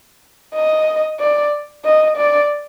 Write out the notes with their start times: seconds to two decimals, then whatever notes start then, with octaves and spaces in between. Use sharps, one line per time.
0.55 D#5
1.20 D5
1.85 D#5
2.17 D5